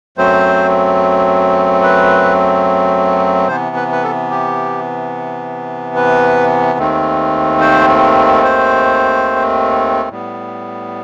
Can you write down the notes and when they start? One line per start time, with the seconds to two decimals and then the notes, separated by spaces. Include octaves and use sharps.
0.18 F#2 F#3 A3 C4 C5
1.83 B4
3.48 C3 E3 B3 C5
3.76 B4
3.92 B4
4.03 A4
4.31 G4
5.96 B4
6.79 D#2 D#3 A3 C4
7.61 C5
8.44 C5
10.09 A2 G3 B3